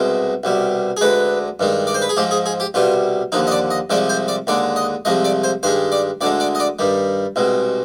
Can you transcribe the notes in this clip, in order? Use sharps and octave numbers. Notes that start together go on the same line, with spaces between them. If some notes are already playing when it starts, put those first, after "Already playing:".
Already playing: C2 B2 G#3
C2 B2 G3
G#4
D2 D3 G#3 B4
G2 D#3 G#3
D5
C5
B4
G#4
G#2 F3 G#3 G4
G#4
G#4
G4
C2 B2 G3 F4
D#2 D3 F3 D#4
D#5
D5
D#5
C2 C3 F3 G#3 D5
C5
D5
D#2 D3 G#3 D5
D#5
C2 C3 F3 G#3 D#5
D5
C5
G2 D#3 G#3 C5
D5
D2 D3 G#3 D5
D5
D#5
D5
G2 D#3 G3
C2 B2 G#3